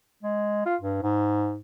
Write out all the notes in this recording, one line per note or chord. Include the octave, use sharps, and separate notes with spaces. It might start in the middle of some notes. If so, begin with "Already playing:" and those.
G#3
F4
G2
G#2